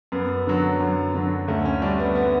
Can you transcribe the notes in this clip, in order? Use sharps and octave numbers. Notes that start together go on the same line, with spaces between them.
F#2 B3
D3 F#3
F#2
D3 F#3
D2 A3
C#4
D3 G3 D4
B3
B3